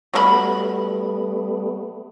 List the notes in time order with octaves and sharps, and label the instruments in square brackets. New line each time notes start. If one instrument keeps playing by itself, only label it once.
[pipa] F#3 A#4 B5 [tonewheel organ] G3 A3 B3